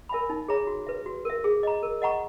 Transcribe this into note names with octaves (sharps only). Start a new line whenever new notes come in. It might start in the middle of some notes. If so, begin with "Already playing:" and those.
A#4 E5 G#5 B5
D#4
G#4 C#5 E5 A#5
F#4
B4 E5
F#4
A#4 E5
G#4
D#5 A#5
A#4
D#5 F#5 A#5 C#6